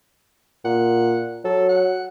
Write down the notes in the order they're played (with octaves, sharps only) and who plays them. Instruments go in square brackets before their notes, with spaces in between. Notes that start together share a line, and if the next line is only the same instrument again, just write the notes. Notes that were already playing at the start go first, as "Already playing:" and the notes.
[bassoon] A#2 [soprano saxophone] F#5
[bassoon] F#3 [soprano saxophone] A4
[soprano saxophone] F#5